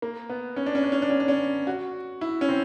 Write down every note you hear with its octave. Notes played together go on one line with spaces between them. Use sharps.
A#3
B3
C#4
D4
C#4
D4
C#4
D4
C#4
D4
C#4
F#4
E4
C#4
C4